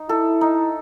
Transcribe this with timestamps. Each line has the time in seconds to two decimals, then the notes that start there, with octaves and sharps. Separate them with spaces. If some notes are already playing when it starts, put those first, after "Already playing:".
Already playing: D#4
0.09 E4 A4
0.41 D#4